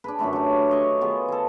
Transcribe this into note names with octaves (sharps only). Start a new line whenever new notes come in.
D4 G#4 B4
F#2 D3 A3 B5
F#3 G4
C#5 D#5 C#6
D#3 B3 F4 G#4
G#4 A4